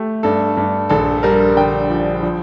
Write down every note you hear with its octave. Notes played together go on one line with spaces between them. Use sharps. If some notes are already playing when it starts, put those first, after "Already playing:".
Already playing: A3 G4
G2 A4
G2
A#1 A4
G3 A#4
D3 G5
F3
F3